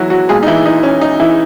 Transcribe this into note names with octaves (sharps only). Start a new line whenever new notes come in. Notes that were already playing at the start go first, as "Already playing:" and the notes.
Already playing: E1 E3 F#3 E4 F#4
F#3 F#4
B1 A#2 G#3 G#4
D#4
E3 E4
D#4
C#4
D#4
E3 E4